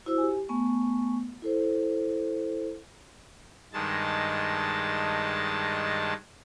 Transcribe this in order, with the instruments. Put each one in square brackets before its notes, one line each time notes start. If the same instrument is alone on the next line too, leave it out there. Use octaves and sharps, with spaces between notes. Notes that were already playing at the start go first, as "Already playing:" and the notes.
[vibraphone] E4 F#4 C5 E6
G4 G#5
A3 B3 G#5 C#6
E4 A4 C5
[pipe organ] G2 D#3 G#3 A5